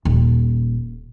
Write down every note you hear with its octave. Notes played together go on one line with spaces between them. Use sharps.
D#1